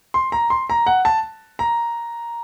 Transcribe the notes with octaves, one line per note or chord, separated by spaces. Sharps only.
C6
A#5
C6
A#5
F#5
A5
A#5